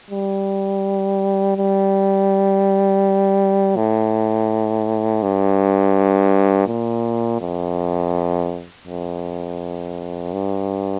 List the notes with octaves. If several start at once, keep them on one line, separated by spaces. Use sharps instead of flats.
G3
G3
A2
G2
A#2
F2
F2
G2